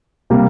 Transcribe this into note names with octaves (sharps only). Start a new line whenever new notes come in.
C3 G3 A#3